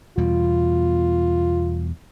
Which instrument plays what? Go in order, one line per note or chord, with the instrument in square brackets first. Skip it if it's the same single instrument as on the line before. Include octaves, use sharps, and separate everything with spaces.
[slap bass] E2 B2 G3 [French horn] F4